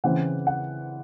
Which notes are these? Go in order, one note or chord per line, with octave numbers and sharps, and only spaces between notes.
C#3 E3 C4 F#5
F#5